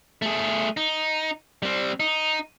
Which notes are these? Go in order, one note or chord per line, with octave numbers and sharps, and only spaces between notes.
A3 G#4
D#4
G3 C4
D#4